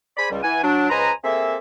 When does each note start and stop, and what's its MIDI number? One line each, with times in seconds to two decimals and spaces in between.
0.17 0.30 68
0.17 0.30 72
0.17 0.30 74
0.17 0.30 80
0.17 0.30 83
0.30 0.41 37
0.30 0.41 55
0.43 0.61 52
0.43 0.61 78
0.43 0.61 80
0.63 0.88 54
0.63 0.88 62
0.90 1.11 37
0.90 1.11 71
0.90 1.11 72
0.90 1.11 75
0.90 1.11 80
0.90 1.11 82
1.24 1.57 58
1.24 1.57 60
1.24 1.57 68
1.24 1.57 69
1.24 1.57 76